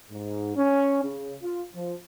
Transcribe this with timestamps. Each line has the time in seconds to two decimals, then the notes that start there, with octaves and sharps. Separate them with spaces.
0.11 G#2
0.56 C#4
1.04 C#3
1.42 F4
1.75 F3